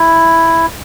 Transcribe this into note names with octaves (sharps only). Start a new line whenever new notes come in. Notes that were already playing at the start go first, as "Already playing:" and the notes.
Already playing: E4